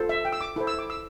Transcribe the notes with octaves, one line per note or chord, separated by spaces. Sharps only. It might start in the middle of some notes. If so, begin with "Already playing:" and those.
Already playing: F4 A4 C5
E5
G5
E6
D6
E4 A4 C5
E6
D6
E6